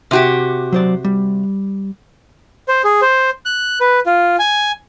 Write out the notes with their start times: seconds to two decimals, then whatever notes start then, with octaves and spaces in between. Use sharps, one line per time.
0.11 C3 F#4 G4
0.73 F#3 C5 D5
1.05 G3
2.68 C5
2.84 G#4
3.02 C5
3.46 F#6
3.81 B4
4.06 F4
4.39 G#5